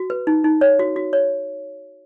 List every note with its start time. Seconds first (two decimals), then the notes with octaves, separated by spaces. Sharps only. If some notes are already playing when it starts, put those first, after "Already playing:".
Already playing: F#4
0.10 B4
0.27 D#4
0.44 D#4
0.61 C#5
0.79 F#4
0.96 F#4
1.13 C#5